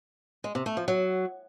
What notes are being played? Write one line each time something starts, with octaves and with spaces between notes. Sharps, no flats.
G#3
C3
A3
F3
F#3